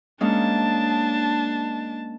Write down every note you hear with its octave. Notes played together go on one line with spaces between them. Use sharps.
G#3 A#3 C#4 D4 A5